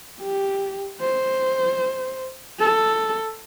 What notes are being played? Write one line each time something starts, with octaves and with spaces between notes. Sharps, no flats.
G4
C5
A4